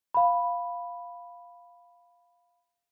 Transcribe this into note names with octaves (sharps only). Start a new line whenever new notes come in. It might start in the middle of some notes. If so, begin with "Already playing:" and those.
F5 B5